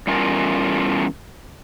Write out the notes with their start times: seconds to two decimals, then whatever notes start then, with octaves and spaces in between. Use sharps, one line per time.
0.07 E2 G3 A3 C#4 F4 A#4